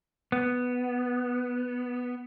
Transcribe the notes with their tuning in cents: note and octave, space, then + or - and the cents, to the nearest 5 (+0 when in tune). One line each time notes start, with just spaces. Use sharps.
B3 +0